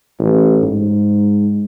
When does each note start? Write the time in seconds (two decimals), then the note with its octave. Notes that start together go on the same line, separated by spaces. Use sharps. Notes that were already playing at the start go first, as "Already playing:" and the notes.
0.19 A1
0.63 G#2